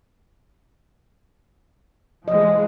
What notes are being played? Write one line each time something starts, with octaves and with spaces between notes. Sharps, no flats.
E3 F3 G#3 D#5